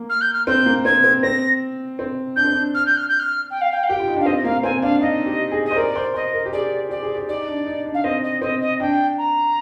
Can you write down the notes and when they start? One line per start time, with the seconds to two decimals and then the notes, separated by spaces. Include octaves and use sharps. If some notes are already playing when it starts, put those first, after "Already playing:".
Already playing: A#3
0.09 F6
0.21 G6
0.33 F6
0.47 C4 G6
0.66 A#3
0.85 C4 G#6
1.04 C4
1.22 C4 A#6
1.99 C4
2.36 D4 G6
2.45 C4
2.52 D4
2.74 F6
2.85 G6
2.97 F6
3.08 G6
3.19 F6
3.50 G5
3.61 F5
3.72 G5
3.83 F5
3.87 G4 G5
3.99 F4
4.08 D#4
4.16 D4
4.20 F5
4.26 C4 D#5
4.44 A#3 F5
4.63 C4 G#5
4.82 D4 F5
5.01 D#4 D#5
5.26 G4
5.51 G#4
5.65 D#5
5.71 C5
5.76 A#4 D5
5.95 C5
6.14 C5 D#5
6.33 A#4
6.45 G4
6.52 G#4 D5
6.90 G4 D5
7.03 G#4
7.15 G4
7.28 D#4 D5
7.47 D4
7.66 D#4
7.85 D4
7.94 F5
8.04 C4 D#5
8.23 D#5
8.41 C4 D#5
8.61 D#5
8.80 D4 G5
9.18 A#5